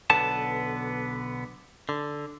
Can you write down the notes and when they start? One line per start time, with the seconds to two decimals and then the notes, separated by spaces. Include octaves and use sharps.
0.10 B1 D3 B3 A5
1.89 D3